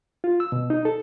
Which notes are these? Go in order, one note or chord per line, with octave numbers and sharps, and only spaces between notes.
F4
E6
B2
D#4
A4